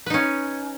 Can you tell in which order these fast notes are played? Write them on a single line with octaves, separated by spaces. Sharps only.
B4 D#4 C#4